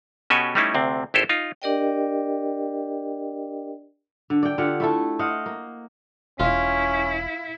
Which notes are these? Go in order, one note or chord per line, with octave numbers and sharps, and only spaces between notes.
B2 C#4 F#4 G4 A4 G#5
G3 A3 C#4 D#4 E4
D2 C3 C4
G#1 E4 G4 A4 C5
D#4 F4
D4 G4 A#4 D5 D#5 G5
D3
D5 G5
D3 F4 G4 F#5
A3 E4 A4
C5 D#5 F5 F#5
A#3
E1 C#4 E4 F4